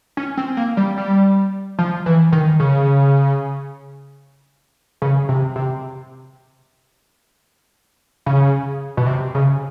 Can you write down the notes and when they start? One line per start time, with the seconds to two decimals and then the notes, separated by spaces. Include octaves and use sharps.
0.17 C#4
0.37 C4
0.57 A#3
0.77 G3
0.98 G3
1.79 F3
2.06 E3
2.32 D#3
2.60 C#3
5.02 C#3
5.29 C3
5.56 C3
8.26 C#3
8.97 B2
9.07 C3
9.35 C#3